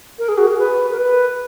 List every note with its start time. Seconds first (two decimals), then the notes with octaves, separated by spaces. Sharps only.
0.19 A#4
0.29 G#4
0.38 F#4
0.47 G#4
0.59 B4
0.91 A#4
0.98 B4